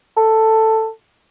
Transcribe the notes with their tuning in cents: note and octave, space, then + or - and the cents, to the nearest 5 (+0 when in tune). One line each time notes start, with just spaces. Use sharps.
A4 +10